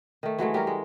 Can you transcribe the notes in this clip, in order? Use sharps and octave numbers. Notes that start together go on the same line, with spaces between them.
D#3 A3
E3 F#3 G#3 A3
G3 C#4 A#4
G#3